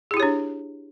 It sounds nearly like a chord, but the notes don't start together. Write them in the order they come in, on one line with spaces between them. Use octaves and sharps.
G#4 E4 G4 C#5 D4